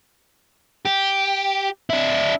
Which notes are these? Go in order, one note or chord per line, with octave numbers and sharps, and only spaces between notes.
G4
D4 E4